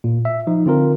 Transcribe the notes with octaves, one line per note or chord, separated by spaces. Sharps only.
A#2
E5
F3 D#4
D3 C4 F4 A#4